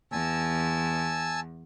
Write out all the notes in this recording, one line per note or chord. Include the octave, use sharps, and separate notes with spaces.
E2 G#5 A5 E6